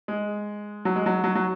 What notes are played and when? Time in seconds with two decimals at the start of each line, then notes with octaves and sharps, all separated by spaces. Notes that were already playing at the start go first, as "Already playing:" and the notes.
0.08 G#3
0.85 F#3
0.96 G#3
1.06 F#3
1.24 F#3
1.35 F#3